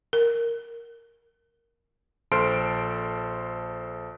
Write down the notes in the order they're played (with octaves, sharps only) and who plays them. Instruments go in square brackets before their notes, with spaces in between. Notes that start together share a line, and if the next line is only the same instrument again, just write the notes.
[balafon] A#4
[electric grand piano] A#1 A4 C5 C6 F6 D7